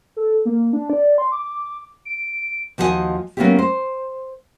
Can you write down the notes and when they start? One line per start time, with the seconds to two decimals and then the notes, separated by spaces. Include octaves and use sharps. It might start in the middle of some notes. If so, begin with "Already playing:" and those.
0.17 A4
0.45 A#3
0.73 D4
0.90 D5
1.18 C6
1.32 D6
2.05 D7
2.78 D#2 F3 F#4 G#4 D#5 G#5
3.37 F#3 A#3 B3 C#4 E4 G4
3.59 C5